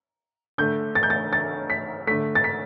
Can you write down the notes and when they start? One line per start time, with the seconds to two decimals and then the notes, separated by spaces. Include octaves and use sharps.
0.58 D3 A3 G6
0.95 A6
1.03 G6
1.10 A6
1.33 A6
1.70 B6
2.07 D3 A3 B6
2.35 A6
2.44 B6